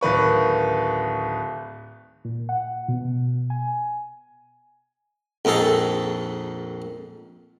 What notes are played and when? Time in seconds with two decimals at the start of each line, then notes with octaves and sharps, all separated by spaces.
0.01 D1 D#3 B4 C#6
2.25 A#2
2.49 F#5
2.88 B2
3.50 G#5
5.45 A#1 F2 D#4 G#4 A4